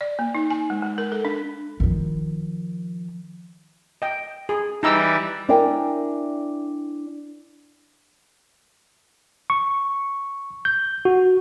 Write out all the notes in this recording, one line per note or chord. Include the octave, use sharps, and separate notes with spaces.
D5
A#3
D#4
G#5
G#3
G#3
A#4
A4
D4
D#3 F3
D#5 G5
G#4
E3 G3 D#4 A#5 E6
D4 E4 A#4 D5 G5 G#5
C#6
G6
F#4